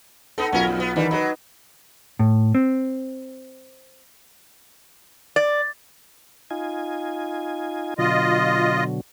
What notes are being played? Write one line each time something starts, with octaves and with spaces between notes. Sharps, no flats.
B3 D#4 A4
B1 C#4 F4 A#4
F2
B3
D#3 E3 G3 D#4
F#3 D#4 B4
A2
C4
D5
D#4 F4 G#5
B2 D3 F#3 F4 D#5